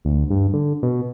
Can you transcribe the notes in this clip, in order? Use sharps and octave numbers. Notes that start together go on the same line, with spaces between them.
D2
G2
D3
B2